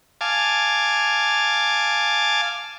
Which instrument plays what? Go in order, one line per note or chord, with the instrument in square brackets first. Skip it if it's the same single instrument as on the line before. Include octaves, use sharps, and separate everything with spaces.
[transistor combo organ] F5 G#5 A5 D6